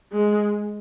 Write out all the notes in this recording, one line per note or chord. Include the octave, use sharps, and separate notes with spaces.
G#3